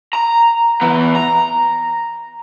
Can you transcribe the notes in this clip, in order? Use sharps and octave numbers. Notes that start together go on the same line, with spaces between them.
A#5
E3 B3
A#5